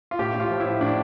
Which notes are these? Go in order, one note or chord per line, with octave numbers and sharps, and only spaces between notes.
F4
A2 G4
A2
F4
F3
E4
A2
A2 D4